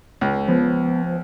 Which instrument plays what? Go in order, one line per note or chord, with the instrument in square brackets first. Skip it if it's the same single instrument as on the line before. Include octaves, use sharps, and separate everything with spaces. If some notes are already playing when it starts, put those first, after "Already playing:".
[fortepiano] C#2
[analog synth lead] F3 [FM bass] B3